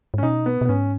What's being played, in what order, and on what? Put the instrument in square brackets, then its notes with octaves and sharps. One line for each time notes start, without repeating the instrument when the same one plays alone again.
[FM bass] G#2
[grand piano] C#4
[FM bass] B2 [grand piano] D#4
[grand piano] B3
[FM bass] B2
[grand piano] B3
[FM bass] G#2 [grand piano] C#4